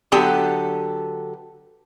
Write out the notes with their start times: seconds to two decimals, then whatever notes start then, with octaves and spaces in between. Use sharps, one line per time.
0.12 D3 F#3 B3 G4 A4